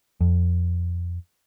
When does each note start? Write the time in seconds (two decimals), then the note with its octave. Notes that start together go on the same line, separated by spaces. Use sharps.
0.21 F2